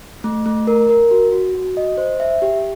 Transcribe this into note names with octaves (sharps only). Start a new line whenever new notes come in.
A3
A3
A#4
A#4
F#4
F#4
F#4
D#5
C5
E5
G4